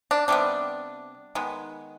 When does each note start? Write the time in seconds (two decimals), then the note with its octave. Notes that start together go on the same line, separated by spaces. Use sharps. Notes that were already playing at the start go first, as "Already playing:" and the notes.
0.11 D4
0.28 C3 G3 B3 D4
1.35 D#3 G#3 B3